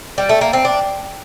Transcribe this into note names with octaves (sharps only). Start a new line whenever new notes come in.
G3
A3
A#3
C4
D4